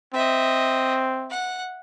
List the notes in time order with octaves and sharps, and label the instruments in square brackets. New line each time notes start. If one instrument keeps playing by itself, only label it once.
[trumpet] C4 [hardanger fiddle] D#5 E5
[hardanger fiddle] F#5